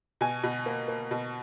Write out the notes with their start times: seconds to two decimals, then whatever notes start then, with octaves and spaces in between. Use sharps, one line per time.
0.21 B2 G#5
0.44 B2
0.66 A#3
0.88 A#3
1.11 B2